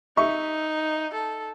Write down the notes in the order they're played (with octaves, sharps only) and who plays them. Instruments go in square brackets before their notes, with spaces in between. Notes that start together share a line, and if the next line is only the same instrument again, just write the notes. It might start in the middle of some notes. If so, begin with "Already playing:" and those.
[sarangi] D#4 [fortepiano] E5 C#6
[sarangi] A4